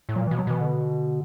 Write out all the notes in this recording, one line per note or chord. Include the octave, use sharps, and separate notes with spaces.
A2
A#2 F#3
E3
B2
F#3
B2 E3
D3